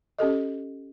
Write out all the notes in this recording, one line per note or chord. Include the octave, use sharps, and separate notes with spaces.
C#4 G4 A4 D#5